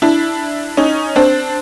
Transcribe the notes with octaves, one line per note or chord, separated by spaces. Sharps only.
D4 E4
C#4 D#4
C4 D4